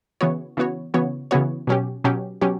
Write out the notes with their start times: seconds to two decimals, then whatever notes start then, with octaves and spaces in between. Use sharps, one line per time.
0.21 C#3 E3 B3 F#4 C#5
0.57 C#3 E3 B3 F#4 C#5
0.94 C#3 E3 B3 F#4 C#5
1.31 C#3 E3 B3 F#4 C#5
1.67 B2 F#3 C#4 G4
2.04 B2 F#3 C#4 G4
2.41 B2 F#3 C#4 G4